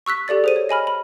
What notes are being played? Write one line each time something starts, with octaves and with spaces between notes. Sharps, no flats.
C#6 E6 F#6 B6
G4 A4 D5 A6
G#4 C5 D#7
C#5
D#5 G#5 B5 F6
B5